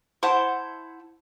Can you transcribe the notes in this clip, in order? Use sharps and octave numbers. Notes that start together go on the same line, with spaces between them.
E4 C5 F#5 A5